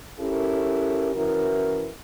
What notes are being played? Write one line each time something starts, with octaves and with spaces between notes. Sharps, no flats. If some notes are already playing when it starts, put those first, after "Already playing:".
C#4 E4 G4 A4 A#4
E3 C#4 E4 F#4 A#4